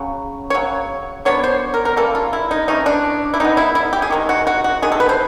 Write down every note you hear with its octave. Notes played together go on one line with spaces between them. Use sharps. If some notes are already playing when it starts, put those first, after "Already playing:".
Already playing: C#3 F#3
C#5
C#3 F#3
F#3 B3 D4 C#5
C5
A#4
A#4
C#3 E3 G3 A#3 A4
F4
E4
D#4
E3 A3 C#4 D#4
D4
E4
D#3 G#3 B3 D#4
E4
E4
G4
G#4
C3 D#3 G#3
F#4
F#4
F#4
C3 D#3 G#4
A4
B4
C5